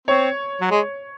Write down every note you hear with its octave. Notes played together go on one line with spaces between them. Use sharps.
C4 C#5
F#3
G#3